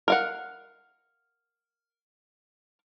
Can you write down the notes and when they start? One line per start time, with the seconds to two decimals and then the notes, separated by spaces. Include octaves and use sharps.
0.08 A#4 F5 F#5